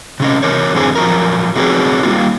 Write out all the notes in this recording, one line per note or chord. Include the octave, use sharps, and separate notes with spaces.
C3 C#4 D#5
E3 A#4 C#5
F#2 D3 E3 C4 G#4
F3 F#3 A#4
A3 C4 F#4 G#4 B4 C#5
G3 A#3 F4